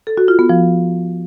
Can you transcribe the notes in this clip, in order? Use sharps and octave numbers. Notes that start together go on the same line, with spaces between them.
A4
F#4
F4
B3
F3